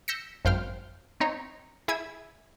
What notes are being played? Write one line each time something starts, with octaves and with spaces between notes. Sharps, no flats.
E6 G6 A#6 B6 C#7
G#1 F#2 C5 F5 G5 F6
C4 D#4 C#5
E4 G#4 E6 G#6